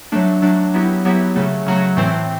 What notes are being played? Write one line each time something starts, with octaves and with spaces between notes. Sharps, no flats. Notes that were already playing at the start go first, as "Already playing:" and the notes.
F#3 A3 D4
F#3 A3 D4
F#3 B3 E4 G4
F#3 B3 E4 G4
C#3 F#3 A3
C#3 F#3 A3
A2 E3 A3 C4